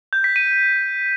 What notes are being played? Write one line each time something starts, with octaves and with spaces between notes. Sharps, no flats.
G6
B6
D#7